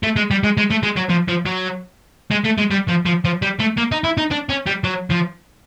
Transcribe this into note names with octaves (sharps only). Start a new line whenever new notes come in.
A3
G#3
G3
G#3
G#3
A3
G#3
F#3
F3
F3
F#3
G#3
A3
G#3
G3
F3
F3
F3
G3
A3
A#3
D#4
E4
D#4
D4
C#4
G3
F#3
F3